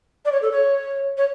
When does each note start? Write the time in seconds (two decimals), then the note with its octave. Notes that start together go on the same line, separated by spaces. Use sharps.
0.25 D5
0.32 C#5
0.42 A4
0.51 C#5
1.18 C#5